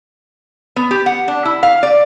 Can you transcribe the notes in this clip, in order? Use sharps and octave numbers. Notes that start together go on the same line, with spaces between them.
B3
G4
F#5
D4
E4
F5
D5